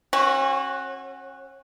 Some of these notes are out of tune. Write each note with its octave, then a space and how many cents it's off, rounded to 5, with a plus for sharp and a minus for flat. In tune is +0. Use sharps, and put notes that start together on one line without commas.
C#4 -40 F#4 +0